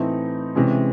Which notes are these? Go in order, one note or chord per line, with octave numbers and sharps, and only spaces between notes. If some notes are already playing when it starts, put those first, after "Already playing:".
Already playing: A2 E3 A3 C4 D#4
C3 E3 G#3 C#4